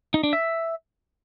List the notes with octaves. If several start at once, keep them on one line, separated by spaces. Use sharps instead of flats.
D#4
D4
E5